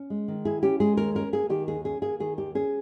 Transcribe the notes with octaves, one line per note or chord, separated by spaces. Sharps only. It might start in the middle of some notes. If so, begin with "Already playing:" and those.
Already playing: C#4
G#3
D#3
E4 G#4
C#4 G4
G#3 G#4
D#2 A#4
C#4 A#4
A#3 G#4
D#3 G4
D#2 G#4
C#4 G#4
A#3 G#4
D#3 G#4
D#2 G4
C#4 G#4